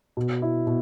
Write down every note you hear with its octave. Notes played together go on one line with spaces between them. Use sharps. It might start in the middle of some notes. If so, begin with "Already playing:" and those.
B2
E4
B2